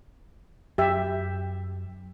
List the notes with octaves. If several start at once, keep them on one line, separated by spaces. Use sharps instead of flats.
F#2 G4 E5